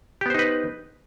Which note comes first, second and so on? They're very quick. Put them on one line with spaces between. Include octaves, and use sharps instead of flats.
G4 B3 C5 D#4 B4